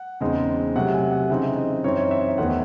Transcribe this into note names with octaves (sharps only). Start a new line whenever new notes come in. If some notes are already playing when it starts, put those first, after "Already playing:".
Already playing: F#5
E2 C#3 G#3 C4 D#4
C3 F#3 A3 F#5
G#5
F#5
C#3 E3 C4 D#4 E5
D#5
F#2 E3 C4 D#4 C#5
C#5
E5
E2 D#3 A3 C4 F#5